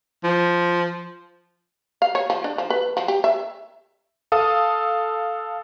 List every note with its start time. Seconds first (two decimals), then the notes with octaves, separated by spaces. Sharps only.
0.24 F3
2.02 F5
2.15 C#5
2.30 F3
2.44 D4
2.58 F3
2.70 B4
2.97 F3
3.08 G4
3.24 E5
4.32 A4 F5 D#6